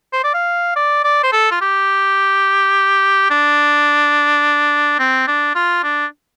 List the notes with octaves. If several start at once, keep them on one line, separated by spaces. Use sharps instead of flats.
C5
D5
F5
D5
D5
C5
A4
F4
G4
D4
C4
D4
F4
D4